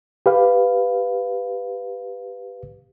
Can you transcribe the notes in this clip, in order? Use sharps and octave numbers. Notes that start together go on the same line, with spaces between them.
G4 B4 F5